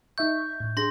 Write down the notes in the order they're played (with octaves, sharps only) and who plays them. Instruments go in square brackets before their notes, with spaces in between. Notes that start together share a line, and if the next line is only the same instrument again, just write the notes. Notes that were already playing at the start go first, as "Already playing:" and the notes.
[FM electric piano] D#4 E5 C#6 [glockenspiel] G6
[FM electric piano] A2
[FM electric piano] D4 G#4 [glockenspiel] C6 A#6